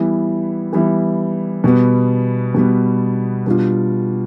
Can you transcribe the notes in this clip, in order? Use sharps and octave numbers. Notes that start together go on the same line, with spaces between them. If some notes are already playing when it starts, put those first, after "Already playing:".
Already playing: E3 G3 B3 E4
E3 G3 B3 E4
B2 G3 B3
B2 G3 B3
B2 G3 D4 F4